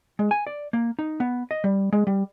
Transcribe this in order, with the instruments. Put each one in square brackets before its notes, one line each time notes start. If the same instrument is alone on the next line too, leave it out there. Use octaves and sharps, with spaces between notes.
[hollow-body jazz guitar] G#3
G#5
D5
A#3
D#4
B3
D#5
G3
G#3
G3